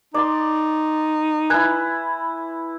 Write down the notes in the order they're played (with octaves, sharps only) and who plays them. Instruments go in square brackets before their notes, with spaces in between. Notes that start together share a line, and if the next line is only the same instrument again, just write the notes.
[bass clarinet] D#4 [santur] D5 C6
[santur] E4 B4 [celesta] G#5 F#6 G#6